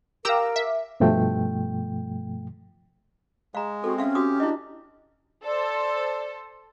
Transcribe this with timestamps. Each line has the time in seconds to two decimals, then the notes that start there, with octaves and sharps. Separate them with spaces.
0.25 G4 A#4 F5 A#5 D6 E6
0.56 E5
1.00 G2 B2 F3 A3 G5
3.55 G#3 F5 A#5
3.84 C4 F#4 A4
3.98 C#4 E5 F5
4.15 F#4 G4 D#6
4.40 D4 E4 D#5
5.45 A4 C5 D5